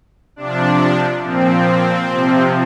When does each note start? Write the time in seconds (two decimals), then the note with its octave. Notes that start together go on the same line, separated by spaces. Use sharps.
0.36 C3 F3 D4
1.23 A#2 F3 C4
2.10 C3 F3